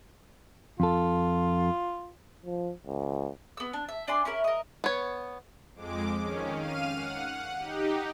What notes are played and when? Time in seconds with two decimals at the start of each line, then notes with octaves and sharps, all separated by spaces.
0.80 F2 F4 A4
2.46 F3
2.87 C#2
3.57 B3 E6
3.73 D4
3.88 E5
4.08 D4 D5 G#5 C6
4.25 C#4 E4 A#4
4.44 A#4 D#5
4.84 B3 C#5
5.75 F2 G#3 D6
6.22 D#3 C#4
6.57 F5 F6 D#7
6.95 F#5
7.58 D#4 G4